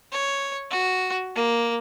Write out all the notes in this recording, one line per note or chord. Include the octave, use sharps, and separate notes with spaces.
C#5
F#4
A#3